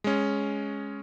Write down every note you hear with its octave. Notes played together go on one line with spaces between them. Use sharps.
G#3 C#4